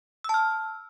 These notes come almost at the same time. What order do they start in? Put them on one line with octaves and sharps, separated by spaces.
E6 A5 F6